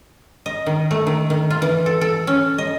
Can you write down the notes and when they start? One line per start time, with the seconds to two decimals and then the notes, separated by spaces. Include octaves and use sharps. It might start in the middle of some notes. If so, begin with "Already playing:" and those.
0.46 D#5
0.66 D#3
0.91 A3
1.07 D#3
1.30 D#3
1.50 F4
1.62 E3
1.86 A4
2.01 A4
2.27 C#4
2.58 D#5